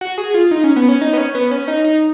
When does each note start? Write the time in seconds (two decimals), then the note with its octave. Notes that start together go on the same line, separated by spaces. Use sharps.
0.01 F#4
0.18 G#4
0.34 F4
0.51 D#4
0.64 C#4
0.76 B3
0.89 C#4
1.01 D#4
1.13 B3
1.18 C#4
1.35 B3
1.51 C#4
1.68 D#4
1.84 D#4